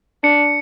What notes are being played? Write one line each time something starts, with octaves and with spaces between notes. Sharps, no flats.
D4 C#7